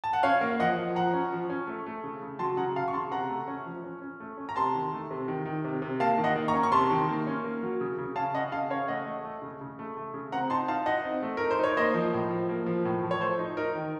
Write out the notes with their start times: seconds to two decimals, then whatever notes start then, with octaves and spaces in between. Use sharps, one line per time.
0.04 A5
0.13 F#5
0.23 C#4 C#5 F5
0.41 A#3
0.60 F3 D#5 F#5
0.78 F3
0.95 F3 F#5 A#5
1.13 C#4
1.32 F3
1.50 C#4
1.67 A3
1.86 A3
2.04 C#3
2.22 C#3
2.39 F#3 A5 C6
2.57 C#3 F#5 A#5
2.76 C#3 F5 A5
2.88 C#6
2.93 C#3 A5 C6
3.12 C3 F#5 A#5
3.29 A3
3.47 C#4
3.66 F3
3.84 C#4
4.02 C#4
4.20 A3
4.37 C#4
4.49 A#5
4.56 C3 A5 C6
4.75 D#3
4.93 A3
5.11 C3
5.28 D#3
5.45 D#3
5.64 C3
5.82 C3
6.00 A#3 F5 A5
6.18 D#3
6.24 D#5 F#5
6.36 A#3
6.48 A#5 C#6
6.54 C#4
6.63 C#6
6.72 C3 A5 C6
6.91 D#3
7.09 A#3
7.27 C#4
7.44 A#3
7.63 F#3
7.81 C#3
7.98 C#3
8.16 C#4 F5 A5
8.34 C#4 D#5 F#5
8.52 C#3 F5 A5
8.70 C#4 C#5 F5
8.88 A3 D#5 F#5
9.06 A3
9.25 A3
9.42 C#3
9.61 C#3
9.79 A3
9.97 A3
10.14 C#3
10.32 C4 F#5 A#5
10.50 D#4 A5 C6
10.68 D#4 F5 A5
10.86 D#4 D#5 F#5
11.05 C4
11.22 A3
11.37 D#4 A#4
11.51 C5
11.59 D#4 C#5
11.77 A#3 C5 D#5
11.94 F3
12.13 A2
12.31 F3
12.49 A#3
12.66 F3
12.85 A2
13.03 F3
13.11 C#5
13.20 A3 C5
13.39 D#4
13.57 D#4 A#4
13.75 D#3